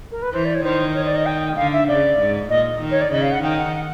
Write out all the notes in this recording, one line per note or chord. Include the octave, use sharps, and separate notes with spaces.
A#4
B4
E3 C5
D5
C#5
D#3 C5
C#5
D5
D#5
G5
D3 F5
E5
C#3 D5
G#2
A#2 D#5
D#3
C#5
D5
C#3 D#5
F5
F#5
D#3 G5
F#5
F#5